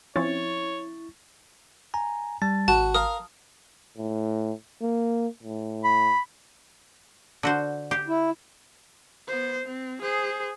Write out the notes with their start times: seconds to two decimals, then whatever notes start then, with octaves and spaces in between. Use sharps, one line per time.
0.16 F3 C4 C#4 E4 C#5 C#6 A6
1.94 G#5 A#5
2.42 G3 A5 A6
2.68 G#1 F#4 A5
2.94 A#4 F5 D#6
3.97 A2
4.82 A#3
5.43 A2
5.84 B5
7.43 D3 F#4 C5
7.91 G4
8.08 E4
9.28 B3 C5
9.65 C4
10.01 G#4 C5